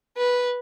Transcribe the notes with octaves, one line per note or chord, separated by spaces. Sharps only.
B4